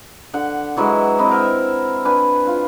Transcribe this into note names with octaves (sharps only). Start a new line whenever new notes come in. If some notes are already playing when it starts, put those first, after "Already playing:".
D3 F#5
E3 F#3 G#3 E4
C4 E4 B4 D#5
A#4 E5
D4 B4 G#5
F4